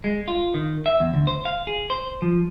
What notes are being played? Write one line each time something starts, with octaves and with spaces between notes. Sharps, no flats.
G#3
F4
D#3
E5
E2
D2
C5
F5
G#4
C5
F3